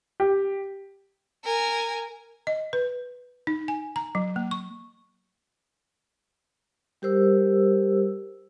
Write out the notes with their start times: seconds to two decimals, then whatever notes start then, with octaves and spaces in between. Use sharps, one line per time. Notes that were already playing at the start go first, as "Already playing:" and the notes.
0.20 G4
1.44 A#4 G#5
2.47 D#5
2.73 B4
3.47 D#4
3.68 G#5
3.96 A#5
4.15 F#3
4.36 A#3
4.51 C#6
7.02 G3 G4 A#4 C5 E6